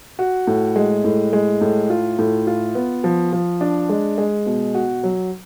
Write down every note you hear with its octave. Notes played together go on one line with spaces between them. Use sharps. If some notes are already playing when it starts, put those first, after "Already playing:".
F#4
A2
G#3
A2
G#3
A2
F4
A2
F4
B3
F3
F3
D4
G#3
G#3
B2
F#4
F#3